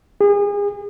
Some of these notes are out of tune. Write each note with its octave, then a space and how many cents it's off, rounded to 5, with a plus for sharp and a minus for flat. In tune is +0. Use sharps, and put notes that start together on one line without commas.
G#4 -35